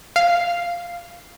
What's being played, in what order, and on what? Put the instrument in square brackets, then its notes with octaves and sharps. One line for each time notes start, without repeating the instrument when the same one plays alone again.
[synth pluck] F5